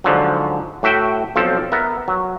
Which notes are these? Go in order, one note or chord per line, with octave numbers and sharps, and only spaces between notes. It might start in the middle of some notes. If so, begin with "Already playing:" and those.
G#2 D3 F3 F#3
A2 F#4 E5 G5
B1 F3 C4 A4
B3 A#4 E5
F#3